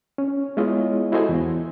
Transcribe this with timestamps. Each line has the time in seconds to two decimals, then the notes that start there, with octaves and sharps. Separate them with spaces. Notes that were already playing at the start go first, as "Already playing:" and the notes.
0.18 C#4
0.57 G#3 B3 E4 F4 C#5 D#5
1.12 E4 F#4 A4 C5 D#5 G#5
1.29 E2